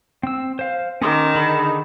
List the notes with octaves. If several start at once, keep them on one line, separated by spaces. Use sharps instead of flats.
C4 E6
C5 F5
D#3 C#4 C6 D6
D3 G#4 B5